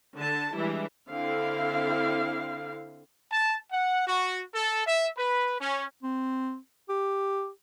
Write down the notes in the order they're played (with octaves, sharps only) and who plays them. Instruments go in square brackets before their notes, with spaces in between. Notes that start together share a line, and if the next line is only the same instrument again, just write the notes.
[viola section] D3 A5
E3 G3 G#3 D4 E4
D3 C4 E4 F5
[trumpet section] A5
F#5
F#4
A4
E5
B4
C#4
[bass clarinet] C4
G4